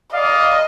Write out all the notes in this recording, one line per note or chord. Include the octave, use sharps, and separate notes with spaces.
D5 D#5 F5